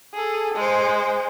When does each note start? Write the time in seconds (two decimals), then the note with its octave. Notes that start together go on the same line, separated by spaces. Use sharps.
0.14 G#4 A4
0.54 G#3 C5